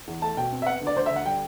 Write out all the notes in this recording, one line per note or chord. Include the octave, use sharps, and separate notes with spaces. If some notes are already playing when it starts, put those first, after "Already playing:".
E2
A3 A5
B2 G5
C4
E5
B3 F#5
D2
D5
D2 C5
E5
D2
F#5
G3 G5